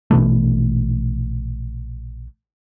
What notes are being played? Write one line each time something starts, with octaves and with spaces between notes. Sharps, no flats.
A#1 B2 E3 A3